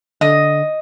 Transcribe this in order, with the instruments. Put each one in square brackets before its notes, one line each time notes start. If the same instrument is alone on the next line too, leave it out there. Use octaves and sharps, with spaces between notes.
[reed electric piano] D3 [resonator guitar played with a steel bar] D#5